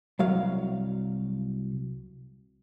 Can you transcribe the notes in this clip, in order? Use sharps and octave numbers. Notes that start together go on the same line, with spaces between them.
C2 F#3 F5